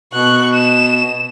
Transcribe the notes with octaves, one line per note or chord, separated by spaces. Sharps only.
B2 C#6 F#6
E7